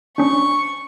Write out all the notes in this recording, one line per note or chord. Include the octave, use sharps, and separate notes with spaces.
C#4 D4 C#6